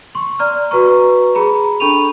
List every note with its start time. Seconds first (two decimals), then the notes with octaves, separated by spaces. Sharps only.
0.15 C6 C#6
0.39 D5 A#5 F6
0.71 F#4 B4 A#5 C#6
1.35 G#4 A#5 B5
1.80 D4 A4 B5 C#6 D#7 F7